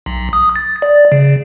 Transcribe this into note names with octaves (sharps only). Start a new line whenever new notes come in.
B1
D#6
A6
D5
C#3